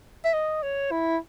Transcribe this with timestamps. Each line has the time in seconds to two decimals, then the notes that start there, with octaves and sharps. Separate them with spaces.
0.25 E5
0.33 D#5
0.63 C#5
0.91 E4